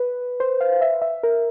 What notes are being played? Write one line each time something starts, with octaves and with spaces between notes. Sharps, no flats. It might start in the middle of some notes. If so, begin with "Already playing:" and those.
Already playing: B4
C5
F5
E5
E5
A#4